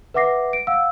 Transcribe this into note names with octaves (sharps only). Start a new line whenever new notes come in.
B4 E5 F#5 D6 A#6 C7
D7
F5 F#5 E6